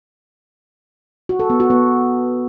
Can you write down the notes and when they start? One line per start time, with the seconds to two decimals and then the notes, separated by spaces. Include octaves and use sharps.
1.29 F#4
1.40 A4
1.50 B3
1.60 F#4
1.70 B3